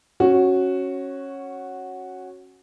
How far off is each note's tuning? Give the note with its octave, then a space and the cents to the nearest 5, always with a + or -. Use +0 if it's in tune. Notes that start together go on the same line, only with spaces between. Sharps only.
C#4 -15 F#4 +0